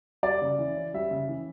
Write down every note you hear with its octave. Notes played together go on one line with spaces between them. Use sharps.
G3 D5
C#3
E3
C#4
G3 E5
C#3
E3